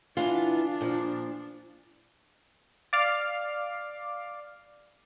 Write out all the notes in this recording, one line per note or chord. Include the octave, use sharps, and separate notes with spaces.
E3 B3 D4 F4
A#2 F3
D5 F5 D6 F6 C7